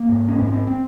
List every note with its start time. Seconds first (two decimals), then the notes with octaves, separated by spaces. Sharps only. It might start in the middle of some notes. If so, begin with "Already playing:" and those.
Already playing: A#3
0.09 G#2
0.29 C#4
0.38 G#2 C4
0.47 C#4
0.53 C4
0.67 C4